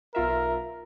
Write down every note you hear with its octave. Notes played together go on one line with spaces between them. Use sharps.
B1 F4 A#4 E5